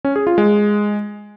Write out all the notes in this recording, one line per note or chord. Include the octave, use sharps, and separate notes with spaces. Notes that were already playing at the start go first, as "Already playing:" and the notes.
C#4
G#4
F4
G#3